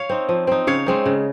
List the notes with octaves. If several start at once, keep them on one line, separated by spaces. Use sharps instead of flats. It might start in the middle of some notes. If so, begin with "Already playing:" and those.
Already playing: C#5 F5
C4 D#4
F3
C4 D#4
C#3 C#5 F5
G#3 C4 D#4
C#3